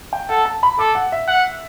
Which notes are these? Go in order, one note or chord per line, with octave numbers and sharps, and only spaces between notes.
G5
A4 F#5
A5
B5
A4 D6
F#5
E5
F#5